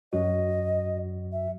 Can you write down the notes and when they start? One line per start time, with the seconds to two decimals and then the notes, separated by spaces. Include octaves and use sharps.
0.13 F#2 F#3 F#4 D#5
1.32 E5